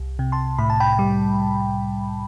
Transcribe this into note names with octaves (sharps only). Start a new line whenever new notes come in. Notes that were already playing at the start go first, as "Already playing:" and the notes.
Already playing: C2
C3
A5 C6
A2 B5
A5
G5 B5
G3